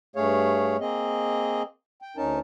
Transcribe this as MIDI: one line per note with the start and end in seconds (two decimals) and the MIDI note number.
0.16 0.77 43
0.16 0.77 57
0.16 0.77 68
0.16 0.77 73
0.16 0.77 77
0.80 1.63 58
0.80 1.63 60
0.80 1.63 68
0.80 1.63 75
2.02 2.17 79
2.17 2.39 38
2.17 2.39 61
2.17 2.39 63
2.17 2.39 70
2.17 2.39 81